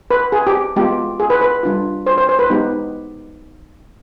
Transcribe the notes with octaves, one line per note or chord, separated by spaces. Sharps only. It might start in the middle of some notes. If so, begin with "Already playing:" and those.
B4
G#4
G4
G#3 B3 F4 G4
G#4
B4
B4
G3 D4 F4
C5
C5
C5
B4
G#3 B3 D#4 G4